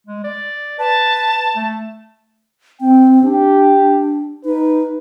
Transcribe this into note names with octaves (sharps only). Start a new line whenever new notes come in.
G#3
D5
B4 A5
A3
C4 G5
D4 G4
D#4 B4